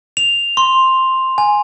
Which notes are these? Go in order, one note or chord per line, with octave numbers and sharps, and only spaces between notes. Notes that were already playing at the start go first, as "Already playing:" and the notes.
F7
C6
G#5